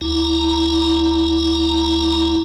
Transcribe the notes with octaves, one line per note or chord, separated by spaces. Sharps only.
D2 E4 A#5